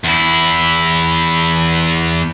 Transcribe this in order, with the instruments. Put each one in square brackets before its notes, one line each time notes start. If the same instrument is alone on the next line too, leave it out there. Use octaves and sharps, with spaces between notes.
[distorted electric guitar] E2 E4